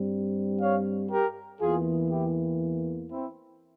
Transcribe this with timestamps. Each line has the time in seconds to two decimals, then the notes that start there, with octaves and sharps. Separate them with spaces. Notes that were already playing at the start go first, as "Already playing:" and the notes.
Already playing: G2 G3 C4
0.61 C#5 F5
1.11 G4 A#4
1.61 E2 E3 A#3 F4 G#4
2.11 E4 G4
3.12 C4 E4